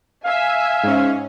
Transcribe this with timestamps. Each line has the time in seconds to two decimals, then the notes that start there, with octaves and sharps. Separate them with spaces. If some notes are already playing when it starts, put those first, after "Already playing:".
0.25 E5 F5 G#5
0.83 G#2 C#4